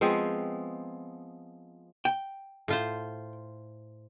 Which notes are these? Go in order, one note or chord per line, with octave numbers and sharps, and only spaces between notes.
F3 G#3 B3 C4
G5
A2 F4 C5